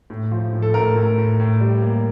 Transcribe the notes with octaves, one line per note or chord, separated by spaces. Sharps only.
A2
F3
A2
A4
A2 A#4
A2
A2
A2
G3
A#3